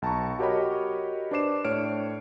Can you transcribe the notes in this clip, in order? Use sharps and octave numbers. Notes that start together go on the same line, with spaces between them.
B1 A5 A#5 C#6
F#4 G4 A#4 C#5 D#5 B5
D4 B4 C5 D6 C7 E7
A2 D4 C#5 F6 D7